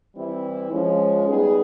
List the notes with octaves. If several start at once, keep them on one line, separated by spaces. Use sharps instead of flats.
E3 G3 C4 E4
F3 G#3 C#4
G3 B3 D#4 G#4